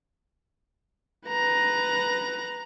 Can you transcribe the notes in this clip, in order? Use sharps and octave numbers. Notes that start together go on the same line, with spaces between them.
B4 A#5